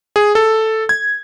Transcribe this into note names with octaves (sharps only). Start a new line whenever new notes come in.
G#4
A4
G#6